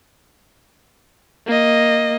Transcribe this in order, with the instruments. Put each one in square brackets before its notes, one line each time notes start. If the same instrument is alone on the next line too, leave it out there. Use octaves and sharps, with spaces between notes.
[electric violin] A#3 D#5